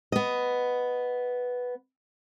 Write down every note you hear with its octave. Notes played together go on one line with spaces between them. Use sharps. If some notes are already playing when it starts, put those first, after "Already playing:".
B3 D#5